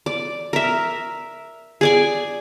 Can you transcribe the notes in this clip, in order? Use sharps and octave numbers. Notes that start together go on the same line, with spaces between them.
D5
A#4 E5
G#4 D5 G#5